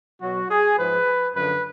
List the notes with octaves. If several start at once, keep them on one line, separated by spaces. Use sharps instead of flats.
B2 F#3 F#4
G#4
G#2 F3 B4
F#2 D3 F3 B4